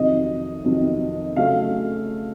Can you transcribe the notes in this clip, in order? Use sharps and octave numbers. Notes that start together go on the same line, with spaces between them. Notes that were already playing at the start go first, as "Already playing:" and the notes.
Already playing: F2 C3 D#3 F#3 D#5
F2 C3 D#3 F#3
C#3 F#3 A3 F5